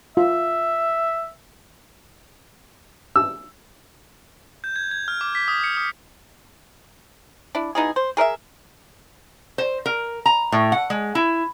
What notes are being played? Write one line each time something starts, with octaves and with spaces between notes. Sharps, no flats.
F4 E5
E6
G6
G#6
G#6
F6
D6
B6
D#6
C#7
D#6
D4 E4
B2 D#4 E4 G#4
C5
G#4 A#4 D#5 E5
C5
A#4
A#5
A2
F#5
G#3
E4